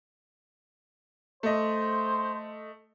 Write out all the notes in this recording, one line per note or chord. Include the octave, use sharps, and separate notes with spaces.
A3 C5 D#5